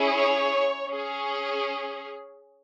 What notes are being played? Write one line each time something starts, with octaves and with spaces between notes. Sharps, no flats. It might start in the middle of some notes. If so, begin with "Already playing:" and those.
Already playing: C#4 E4 G#4
C#5
C#4 G#4